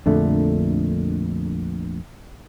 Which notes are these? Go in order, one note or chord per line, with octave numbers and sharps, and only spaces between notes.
A#1 F2 D3 A3